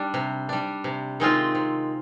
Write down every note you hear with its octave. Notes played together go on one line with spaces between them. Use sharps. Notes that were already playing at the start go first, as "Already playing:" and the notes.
Already playing: G3 D4
C3
G3 D4
C3
D#3 G#3 C4 F4
C3